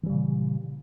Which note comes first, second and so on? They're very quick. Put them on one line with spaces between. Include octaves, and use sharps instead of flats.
E3 G3 C#3 A#2